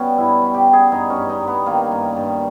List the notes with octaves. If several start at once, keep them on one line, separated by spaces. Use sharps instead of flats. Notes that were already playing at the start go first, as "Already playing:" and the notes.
Already playing: B2 G3 B3 C#4
G2 E4
G3
G4
G3
G#4
G2 D#4
C#4
G2
D#4
G2
B3
D#3 A#3
G2
G2